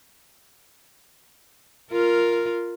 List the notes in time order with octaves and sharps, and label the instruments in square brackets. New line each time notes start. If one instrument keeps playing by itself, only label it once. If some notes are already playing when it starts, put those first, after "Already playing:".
[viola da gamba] F4 A#4